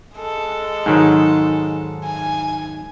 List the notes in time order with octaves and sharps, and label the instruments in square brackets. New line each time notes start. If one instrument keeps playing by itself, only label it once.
[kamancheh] G#3 A4
[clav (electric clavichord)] G#2 D#3 F#3
[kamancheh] G#5